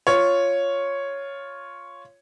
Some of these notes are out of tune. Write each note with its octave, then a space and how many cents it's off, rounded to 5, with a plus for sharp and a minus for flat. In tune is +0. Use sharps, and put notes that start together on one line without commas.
F4 +0 C#5 +0